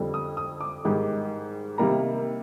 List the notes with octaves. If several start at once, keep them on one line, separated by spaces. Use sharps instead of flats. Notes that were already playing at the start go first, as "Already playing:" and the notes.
Already playing: F2 D3 G3
D#6
D#6
D6
G#2 D#3 G3
C3 D#3 G3 A#3 A#5